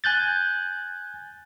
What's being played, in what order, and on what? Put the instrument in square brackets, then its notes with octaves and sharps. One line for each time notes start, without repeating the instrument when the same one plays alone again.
[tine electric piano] G#5 F#6 G6 A6